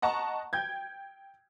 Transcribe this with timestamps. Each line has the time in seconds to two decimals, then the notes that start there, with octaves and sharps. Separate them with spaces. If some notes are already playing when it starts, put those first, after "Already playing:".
0.02 D#5 F#5 A5 A#5 C#6
0.53 G5 G6 G#6